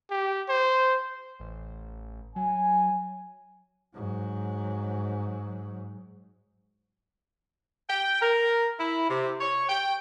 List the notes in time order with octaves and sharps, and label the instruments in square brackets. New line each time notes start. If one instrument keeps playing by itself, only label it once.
[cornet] G4
C5
[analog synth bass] A1
[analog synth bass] F#3 [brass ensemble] G#5
[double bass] G#2 F#3
[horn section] G5
A#4
E4
C3
C#5
G5